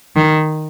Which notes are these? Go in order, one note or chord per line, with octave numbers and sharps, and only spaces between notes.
D#3